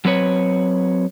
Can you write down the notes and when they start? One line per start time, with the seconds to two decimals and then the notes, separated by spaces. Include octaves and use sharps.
0.05 F#3 C4 B4 C#5